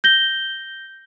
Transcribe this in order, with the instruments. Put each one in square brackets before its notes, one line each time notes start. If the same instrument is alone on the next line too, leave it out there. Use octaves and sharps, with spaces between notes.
[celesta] G6 A#6 G7